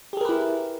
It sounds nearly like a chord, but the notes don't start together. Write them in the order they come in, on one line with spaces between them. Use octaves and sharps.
G4 G#4 A#4 B4 E4